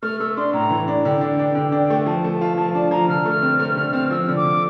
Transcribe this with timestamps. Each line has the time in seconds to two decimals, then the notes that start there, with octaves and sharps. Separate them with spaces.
0.03 A3 F6
0.20 A3 E6
0.37 D4 C6
0.53 A2 A#5
0.70 E3
0.88 D4
1.05 D3 G5
1.21 D4
1.39 D4
1.55 D3
1.72 D4
1.90 A3
2.06 F3 A5
2.24 A3
2.32 A5
2.41 F4
2.57 F3 A5
2.74 D4 A5
2.91 F3 A#5
3.09 D3 F6
3.25 A3
3.42 C4
3.60 A3
3.77 D3
3.93 C4
4.11 F3 E6
4.28 D3
4.37 D6
4.44 D3